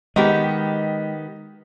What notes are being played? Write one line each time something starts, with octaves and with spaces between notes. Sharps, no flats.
D#3 G#3 B3 G4 D#5